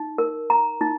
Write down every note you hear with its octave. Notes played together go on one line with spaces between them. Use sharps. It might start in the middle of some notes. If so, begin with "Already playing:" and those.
Already playing: D#4
A#4
A#5
D#4